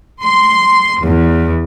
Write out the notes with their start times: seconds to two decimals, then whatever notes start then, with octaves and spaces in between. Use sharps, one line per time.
0.22 C6
1.02 E2